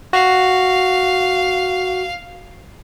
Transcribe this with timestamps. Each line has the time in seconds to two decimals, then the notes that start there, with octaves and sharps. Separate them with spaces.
0.13 F#4 F5